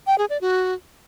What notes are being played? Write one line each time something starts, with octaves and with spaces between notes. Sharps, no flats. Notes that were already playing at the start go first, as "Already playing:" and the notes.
G5
G#4
D5
F#4